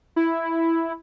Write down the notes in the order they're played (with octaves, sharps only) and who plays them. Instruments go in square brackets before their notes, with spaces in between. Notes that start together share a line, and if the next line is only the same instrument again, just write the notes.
[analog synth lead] E4